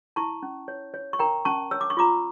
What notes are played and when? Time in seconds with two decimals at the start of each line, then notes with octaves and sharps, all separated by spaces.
0.16 E4 A5 C#6
0.43 C#4
0.68 C#5
0.94 C#5
1.13 C#6
1.19 A#4 G5 A#5
1.45 C#4 A5 C#6
1.71 C#5 E6
1.81 D6
1.90 C#6
1.97 F4 A#5 D6